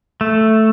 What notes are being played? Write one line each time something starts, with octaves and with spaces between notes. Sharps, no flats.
A3